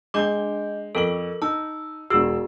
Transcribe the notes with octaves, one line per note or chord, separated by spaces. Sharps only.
G#3 D4 D#5 D6 G6 G7
F2 A4 A#4 F#7
D#4 A5 E6
E1 F#4 G#4 E6